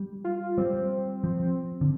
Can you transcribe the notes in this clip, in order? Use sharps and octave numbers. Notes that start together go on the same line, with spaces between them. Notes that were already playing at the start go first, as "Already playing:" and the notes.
Already playing: G3
F4
G3 C4
F3
D3